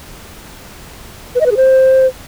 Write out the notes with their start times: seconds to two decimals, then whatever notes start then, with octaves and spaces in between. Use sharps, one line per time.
1.35 B4
1.40 D#5
1.46 B4
1.51 G#4
1.57 C5